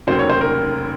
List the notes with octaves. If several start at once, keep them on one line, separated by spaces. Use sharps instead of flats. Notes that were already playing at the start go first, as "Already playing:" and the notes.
F1 D#2 C#3 F#3 A#3 C5
C#5
C5
A#4